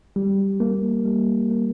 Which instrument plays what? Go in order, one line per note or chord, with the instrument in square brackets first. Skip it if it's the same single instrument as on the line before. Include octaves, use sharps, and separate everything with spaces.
[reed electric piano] G3
A#3
G3
A#3